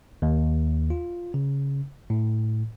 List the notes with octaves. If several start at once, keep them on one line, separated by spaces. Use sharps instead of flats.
D#2
F4
C#3
A2